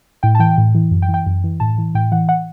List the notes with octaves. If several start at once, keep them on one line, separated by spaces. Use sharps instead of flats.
A2 G5
A5
E3 G5
A2
E3
F#2
G5
E3
G5
F#2
E3
A2 A5
E3
A2 G5
E3 F#5
F#5